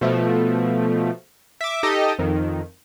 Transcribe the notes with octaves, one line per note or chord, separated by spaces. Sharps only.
B2 F3 A3
E5 D6
D#4 G4 A4 D#5
F2 D#3